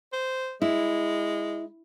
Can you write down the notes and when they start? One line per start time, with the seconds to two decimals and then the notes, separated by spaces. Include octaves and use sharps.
0.12 C5
0.62 G#3 E4